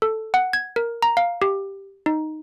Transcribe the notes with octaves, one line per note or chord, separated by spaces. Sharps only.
A4
F#5
G#6
A#4
A#5
F5
G4
D#4